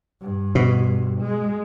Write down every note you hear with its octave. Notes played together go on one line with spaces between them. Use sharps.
G2
B2
G#3